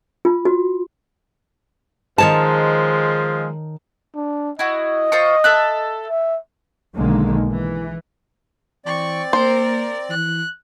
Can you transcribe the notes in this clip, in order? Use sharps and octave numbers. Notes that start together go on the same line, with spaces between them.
F4
F#4
D#3 F3 G#3 C#5 A5
D4
E4 F#4 D#5
F4 C5 C#6
A4 E5 F#6
E5
B1 D3 D#3 G#3 A#3
E3
E3 C4 D5 C#6
A#3 A#4 C5
E3 F#6